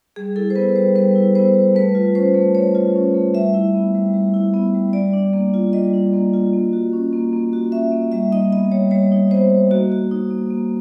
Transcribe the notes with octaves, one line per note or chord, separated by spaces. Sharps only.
G3 G#4
E4 A4
C5
B3 B4
G3 C5
G3 B4
E4
B3 C5
G3
A3 B4
F4
C#4 C5
A3
A3 C#5
F4
C#4
A3
G3 E5
E4
B3
G3
G3
E4
B3
G3
G3 D5
D4
A#3
F4
G3 D#5
D4
A#3
F4
A#3
F#4
C#4
A#3
A#3
F#4
C#4 E5
A#3
G3 E5
D#4 D#5
B3 D#5
G3 C#5
G3 C#5
D#4
B3 C5
G3
A#3 F#4
F#4
D#4
A#3
A#3